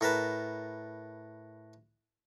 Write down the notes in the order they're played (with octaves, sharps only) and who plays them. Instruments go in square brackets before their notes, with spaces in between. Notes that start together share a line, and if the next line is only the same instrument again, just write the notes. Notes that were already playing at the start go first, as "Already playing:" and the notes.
[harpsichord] A2 A#4 B4 A5